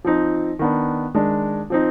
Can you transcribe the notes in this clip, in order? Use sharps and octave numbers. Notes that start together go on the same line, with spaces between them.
F3 C4 D#4
D#3 B3 D4
D#3 G#3 D4
F3 C4 D#4